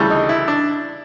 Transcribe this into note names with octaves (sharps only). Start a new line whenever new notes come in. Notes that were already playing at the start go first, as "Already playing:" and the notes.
Already playing: D2 C#3 E3 G3
D#4
E4
D4